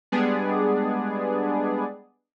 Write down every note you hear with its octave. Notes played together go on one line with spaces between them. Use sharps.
G3 G#3 B3 D4 G#4 D5